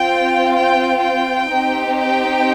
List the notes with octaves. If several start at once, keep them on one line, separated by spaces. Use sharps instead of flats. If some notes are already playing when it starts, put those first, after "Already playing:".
Already playing: C4 F4 G5
G5
G5
C4 D#4 G4
G5